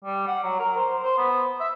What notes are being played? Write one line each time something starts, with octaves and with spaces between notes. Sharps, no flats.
G3
F#5
F#3
A#4
C5
C5
B3
E5